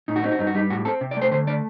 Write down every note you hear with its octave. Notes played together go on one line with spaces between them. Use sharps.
A2 D#4
F#4
C4 D#4
F#4
G2 D#4
F#4
G3 D#4
A2 F#4
C4 A4
C3
D5
A3 C5
D3 C5
A3 D5